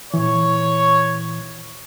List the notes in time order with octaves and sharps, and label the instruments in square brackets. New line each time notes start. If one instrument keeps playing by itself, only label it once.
[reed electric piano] A#2 E3 [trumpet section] C#5